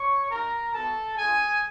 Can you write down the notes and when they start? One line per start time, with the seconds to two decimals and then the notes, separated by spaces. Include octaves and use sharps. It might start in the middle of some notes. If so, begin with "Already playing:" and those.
Already playing: C#5 C#6
0.30 A#3 D#4 G4 A#4 A#5
0.74 B3 D#4 F#4 A4 A5
1.17 A3 D4 F4 G#4 G#5